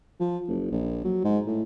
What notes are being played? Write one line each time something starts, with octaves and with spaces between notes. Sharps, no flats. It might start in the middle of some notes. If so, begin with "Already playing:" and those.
F3
F#1
A#1
F#3
G#2
A2